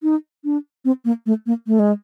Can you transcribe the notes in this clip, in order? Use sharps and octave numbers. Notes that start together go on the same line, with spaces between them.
D#4
D4
C4
A#3
A3
A#3
A3
G#3